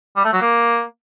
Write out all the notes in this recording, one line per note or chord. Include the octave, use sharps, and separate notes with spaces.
G3
A3
F#3
A#3